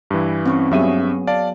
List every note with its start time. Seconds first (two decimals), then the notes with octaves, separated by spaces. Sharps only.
0.11 G2 E3
0.46 C4 C#4 C#6
0.71 G2 F#3 B3 G#4 E5 D#7
1.27 D5 F5 A5